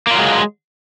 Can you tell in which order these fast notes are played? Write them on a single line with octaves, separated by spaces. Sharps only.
A#3 F4 F#3 G#3